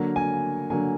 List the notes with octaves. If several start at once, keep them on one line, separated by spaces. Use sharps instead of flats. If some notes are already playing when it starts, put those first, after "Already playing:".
Already playing: D3 F#3 A#3
G#5
D3 F#3 A#3 G#5